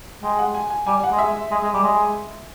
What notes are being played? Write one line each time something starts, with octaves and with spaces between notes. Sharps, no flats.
G#3 G5
F#5
G#5
G#5
G3 G#5
F#5
G#3
E5
G#3
G#3
G3
G#3